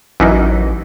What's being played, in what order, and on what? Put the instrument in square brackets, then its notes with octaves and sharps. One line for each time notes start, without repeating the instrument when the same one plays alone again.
[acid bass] A1 [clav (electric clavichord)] F#2 E3 D#4